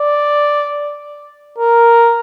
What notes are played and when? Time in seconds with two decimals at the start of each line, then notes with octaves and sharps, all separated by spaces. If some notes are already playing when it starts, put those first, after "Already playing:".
Already playing: D5
1.59 A#4